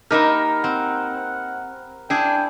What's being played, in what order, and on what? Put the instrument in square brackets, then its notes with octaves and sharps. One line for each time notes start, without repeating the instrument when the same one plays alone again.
[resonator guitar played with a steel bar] A#3 D#4 [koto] G4 B4 E5 [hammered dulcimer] A#4 B5
[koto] C4 [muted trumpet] F#5
[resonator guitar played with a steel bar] D4 [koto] E4 G#4 [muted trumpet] G5